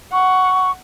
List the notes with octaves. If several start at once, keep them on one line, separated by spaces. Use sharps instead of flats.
F#5 C#6